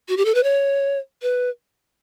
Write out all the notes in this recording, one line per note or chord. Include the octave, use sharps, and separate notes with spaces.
F#4
G4
A4
B4
C#5
B4